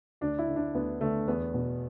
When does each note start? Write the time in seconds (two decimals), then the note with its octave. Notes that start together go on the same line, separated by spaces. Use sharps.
0.21 D2 D4
0.39 E4
0.48 D3
0.56 D4
0.74 D2 B3
1.01 D3 A3
1.28 E2 B3
1.54 B2